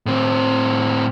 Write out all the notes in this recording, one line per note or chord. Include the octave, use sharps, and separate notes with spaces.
A2 C4